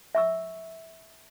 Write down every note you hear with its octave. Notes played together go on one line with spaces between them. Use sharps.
E5 C#6 E6